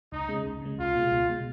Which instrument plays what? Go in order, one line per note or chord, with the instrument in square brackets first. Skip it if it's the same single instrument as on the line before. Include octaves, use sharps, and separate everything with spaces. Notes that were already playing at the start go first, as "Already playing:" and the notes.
[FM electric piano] C#2 [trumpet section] D#4
[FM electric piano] C#3 G#3
C#2
C#3 G#3
[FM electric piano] C#2 [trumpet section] F4
[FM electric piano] B2 G#3
C#2
B2 G#3